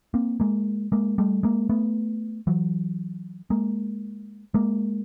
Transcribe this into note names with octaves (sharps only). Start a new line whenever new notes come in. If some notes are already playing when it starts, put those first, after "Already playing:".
A#3 C4
G#3 A#3
G#3 A#3
G3 A3
G#3 A#3
A3 B3
E3 F#3
G#3 A#3
G#3 A#3